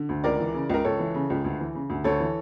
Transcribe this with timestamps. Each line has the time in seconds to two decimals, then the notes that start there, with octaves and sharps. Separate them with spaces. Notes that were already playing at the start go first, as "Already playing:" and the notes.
Already playing: D3
0.09 D2
0.24 C#2 A#4 D5
0.40 E3
0.54 C#3
0.69 C#2 A#4
0.85 C#2 A4 C#5
0.99 E3
1.14 C#3
1.30 C#2
1.45 D2
1.60 E3
1.75 C#3
1.90 D2
2.04 D2 A4 C#5
2.20 E3